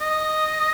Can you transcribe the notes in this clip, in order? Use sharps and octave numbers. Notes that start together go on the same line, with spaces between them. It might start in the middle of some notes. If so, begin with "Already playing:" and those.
D#5